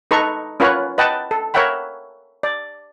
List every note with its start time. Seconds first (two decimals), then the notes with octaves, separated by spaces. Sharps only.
0.11 D#4 A4 B4 A#5 C#6
0.60 C#4 F4 A#4 B4 C#5 F#5
0.98 B4 D#5 F#5 G5 A5
1.31 A4
1.54 A#4 C#5 E5 F#5 G5 B5
2.43 D5